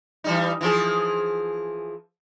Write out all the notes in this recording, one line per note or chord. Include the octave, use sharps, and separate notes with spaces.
E3 G3 D#4
E3 F3 G#4